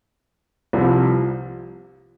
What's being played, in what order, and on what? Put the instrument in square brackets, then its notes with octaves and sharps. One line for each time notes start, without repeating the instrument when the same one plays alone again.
[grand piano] C2 C3 F3